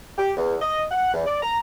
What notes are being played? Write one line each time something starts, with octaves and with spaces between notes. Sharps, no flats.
G4
E2
D#5
F#5
E2
D5
A#5